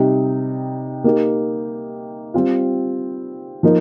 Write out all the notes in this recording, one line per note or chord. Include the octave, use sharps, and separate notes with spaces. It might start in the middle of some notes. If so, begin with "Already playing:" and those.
Already playing: C3 G3 D#4
A#3 D#4 G4
G3 C4 F4
F3 A#3 D#4